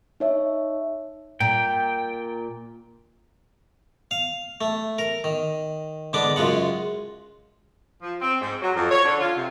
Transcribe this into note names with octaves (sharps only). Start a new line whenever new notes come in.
D#4 C#5 E5
A#2 G5
F5
A3
A#4
D#3
G#2 D3 B3 D4 D6
F#2 C#3 G#3 F4 F#5
F3
C4
G#2
F#3
F2
C#5
D3
F4
C3